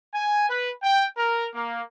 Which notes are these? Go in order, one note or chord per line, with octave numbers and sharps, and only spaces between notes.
G#5
B4
G5
A#4
A#3